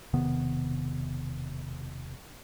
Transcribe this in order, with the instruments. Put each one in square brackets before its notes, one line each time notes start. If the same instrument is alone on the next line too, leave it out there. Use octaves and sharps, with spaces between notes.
[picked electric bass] E1 C3 D#3 B3